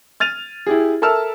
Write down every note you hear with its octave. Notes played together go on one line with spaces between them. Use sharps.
F6 A6 D#7 F7
E4 G4 G#4
A4 A#4 E5 A5 E6 F6